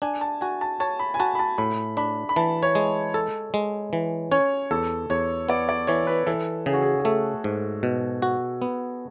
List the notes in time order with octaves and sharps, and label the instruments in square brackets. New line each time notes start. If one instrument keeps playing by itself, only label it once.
[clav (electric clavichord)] D4 [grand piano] G#5
[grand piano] A5
[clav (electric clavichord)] F#4 [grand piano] G#5
[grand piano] A5
[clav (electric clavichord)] C#5 [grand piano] A5
[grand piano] B5
G#5
[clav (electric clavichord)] F#4 [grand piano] A5
[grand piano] B5
A5
[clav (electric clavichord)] A2 [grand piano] B5
[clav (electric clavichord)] D4 [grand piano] B5
[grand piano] B5
[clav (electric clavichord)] E3 [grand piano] A5
[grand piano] C#5
[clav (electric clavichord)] G#3
A4
G#3
E3
[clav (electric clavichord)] C#4 [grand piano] C#5
[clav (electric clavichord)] E2 [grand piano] A4
[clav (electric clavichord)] E2 [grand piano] C#5
[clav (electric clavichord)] B3 [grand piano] D5
[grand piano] D5
[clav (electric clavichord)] E3 [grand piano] C#5
[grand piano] B4
[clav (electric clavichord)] E3 [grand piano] A4
[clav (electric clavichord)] C#3 [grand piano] G#4
[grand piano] F#4
G#4
G#4
[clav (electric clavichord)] A3 [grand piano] A4
[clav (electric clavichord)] G#2
B2
F#4
B3